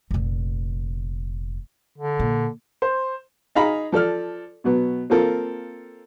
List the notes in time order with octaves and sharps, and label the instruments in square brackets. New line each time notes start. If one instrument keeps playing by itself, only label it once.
[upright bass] F1 A#2
[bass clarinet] D3
[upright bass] A#2
[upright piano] C5
[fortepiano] D#4 G#4 F5 A#5 B5
F3 A4 D5 F6
B2 F#3 B3
A#3 C4 F4 A4 A#4